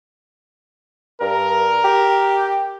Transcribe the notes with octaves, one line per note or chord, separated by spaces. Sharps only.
G2 A#4
G4